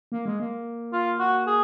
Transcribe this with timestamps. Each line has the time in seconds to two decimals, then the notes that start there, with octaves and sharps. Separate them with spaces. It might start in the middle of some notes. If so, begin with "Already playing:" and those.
0.12 A#3
0.26 G#3
0.40 A#3
0.93 F4
1.20 F#4
1.47 G#4